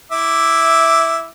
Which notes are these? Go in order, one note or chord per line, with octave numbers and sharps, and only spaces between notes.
E4 E5 D6